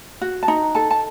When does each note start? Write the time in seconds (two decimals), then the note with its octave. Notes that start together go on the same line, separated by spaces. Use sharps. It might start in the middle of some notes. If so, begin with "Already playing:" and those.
0.22 F#4
0.43 A5
0.48 D#4 A#5
0.75 A4 A5
0.91 A5